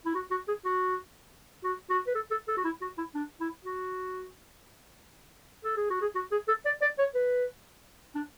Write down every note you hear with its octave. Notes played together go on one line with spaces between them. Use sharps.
E4
F#4
F#4
G#4
F#4
F#4
F#4
B4
A4
A4
A4
F#4
E4
F#4
E4
D4
E4
F#4
A4
G#4
F#4
G#4
F#4
G#4
A4
D5
D5
C#5
B4
D4